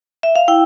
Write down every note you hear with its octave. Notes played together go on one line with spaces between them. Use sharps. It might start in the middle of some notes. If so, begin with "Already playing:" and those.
E5
F5
E4 G5